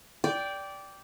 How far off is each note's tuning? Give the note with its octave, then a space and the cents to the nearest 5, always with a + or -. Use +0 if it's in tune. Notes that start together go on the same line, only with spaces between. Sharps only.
D5 -15 G5 +0